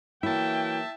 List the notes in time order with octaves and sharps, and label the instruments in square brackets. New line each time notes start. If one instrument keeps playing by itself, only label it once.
[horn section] E3 F#3 A#3 [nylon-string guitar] E4 [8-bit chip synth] E5 A5 [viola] G5